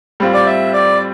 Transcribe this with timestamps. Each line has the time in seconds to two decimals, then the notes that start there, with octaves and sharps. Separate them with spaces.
0.20 A2 G3 C4 F4
0.34 D5
0.46 E5
0.73 D5